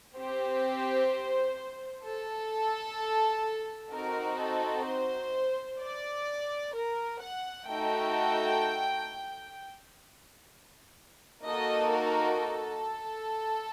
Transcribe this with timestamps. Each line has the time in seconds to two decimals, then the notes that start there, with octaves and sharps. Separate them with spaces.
0.16 C4 G4 C5
2.04 A4
3.92 C4 D#4 F#4 A#4
4.39 A4
4.86 C5
5.79 D5
6.74 A#4
7.20 F#5
7.68 A3 D#4 F#4 A4 G5
11.43 A#3 D#4 F#4 A4 D#5
11.90 A#4
12.37 A4